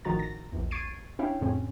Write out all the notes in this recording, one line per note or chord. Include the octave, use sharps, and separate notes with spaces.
A1 D#3 F3 F#4 A#5 A6
A#6
A#1 E2
C#6 G#6 A6 C7 D7 D#7
C#4 D4 E4 C#5 F5 G5
F2 A2 C#3 C4 C#4